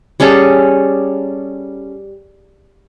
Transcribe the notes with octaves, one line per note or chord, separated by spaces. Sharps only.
G3 C#4 G#4 A4